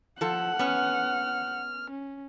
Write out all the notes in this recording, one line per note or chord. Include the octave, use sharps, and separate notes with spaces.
F3 A4 F#5
B3 C#4 F6
C#4